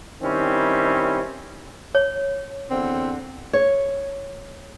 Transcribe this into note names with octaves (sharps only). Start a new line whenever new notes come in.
D#3 G3 C4 C#4 E4
C#5
E2 D3 C4
C#5